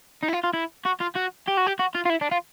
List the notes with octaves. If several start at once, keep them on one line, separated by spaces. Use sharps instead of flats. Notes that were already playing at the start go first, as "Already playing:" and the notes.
D#4
E4
F4
F4
E4
F#4
F4
F#4
G4
F#4
G4
F#4
F4
F4
E4
D4
F4